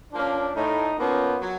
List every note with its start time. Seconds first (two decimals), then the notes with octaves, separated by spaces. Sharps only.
0.13 F3 A#3 C#4 D4
0.56 A2 D#4
0.99 F3 A#3 B3 C#4
1.41 F#3